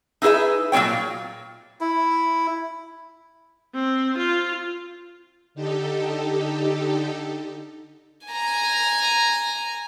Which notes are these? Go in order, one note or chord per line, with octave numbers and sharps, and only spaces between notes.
D#4 E4 G#4 B4 E5
A#2 F#3 C4 C#5 G5
E4
C4
F4
D3 D#4 G4 A4
G#5 A#5